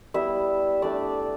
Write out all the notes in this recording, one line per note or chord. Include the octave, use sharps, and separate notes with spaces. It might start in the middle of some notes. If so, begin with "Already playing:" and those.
G3 B3 E4 E5
A3 D4 D5